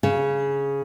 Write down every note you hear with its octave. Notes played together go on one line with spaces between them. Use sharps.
C#3